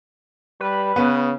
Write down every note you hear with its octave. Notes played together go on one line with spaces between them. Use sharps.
G3 B4
C#3 B3